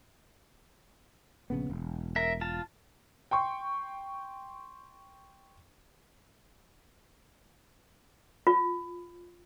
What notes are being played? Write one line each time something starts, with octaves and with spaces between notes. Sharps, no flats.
A#1 C#3 B3
E1
A#4 E5
F4 A5
G5 C6 C#6
F4